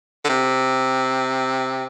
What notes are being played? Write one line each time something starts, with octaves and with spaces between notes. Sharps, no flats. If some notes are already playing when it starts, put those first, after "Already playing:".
D3
C3